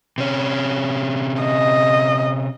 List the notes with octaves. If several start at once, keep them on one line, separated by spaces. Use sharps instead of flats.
C3 C#4
D#5